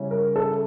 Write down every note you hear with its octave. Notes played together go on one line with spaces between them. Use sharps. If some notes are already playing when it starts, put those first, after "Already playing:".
Already playing: C#3 G3 C#4 E4
A#4
A4